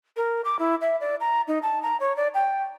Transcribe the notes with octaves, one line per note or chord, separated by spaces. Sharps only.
A#4
D6
E4
E5
D5
A#5
D#4
A5
A#5
C#5
D5
G5